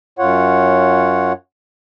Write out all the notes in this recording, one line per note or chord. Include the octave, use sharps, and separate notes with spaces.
F#2 F4 C#5 F#5